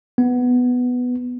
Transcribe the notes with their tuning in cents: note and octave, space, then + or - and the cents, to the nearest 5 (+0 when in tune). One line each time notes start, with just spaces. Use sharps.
B3 +5